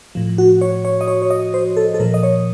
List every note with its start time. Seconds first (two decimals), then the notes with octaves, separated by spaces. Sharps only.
0.15 A2 F3
0.38 F#4
0.61 C#5
0.85 C#5
1.01 D#5
1.08 C#5
1.22 C#5
1.30 D#5
1.54 C5
1.77 A4
1.94 A4
2.00 A#2 F3 A#4
2.14 D#5
2.23 C#5